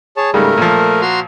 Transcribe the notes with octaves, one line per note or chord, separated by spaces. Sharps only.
G#4 C#5 A5
G#2 C#3 G3 A3 A#4
A#2 F3
F#4 A#5 C6